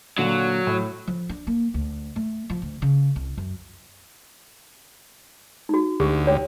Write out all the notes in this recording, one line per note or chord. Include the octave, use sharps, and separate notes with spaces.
A#2 D3 F#3
A2
F3
D4
A#3
D2
A3
F3
D2
C#3
C2
F#2
D#4 F#4
D2 G4
C#5 G5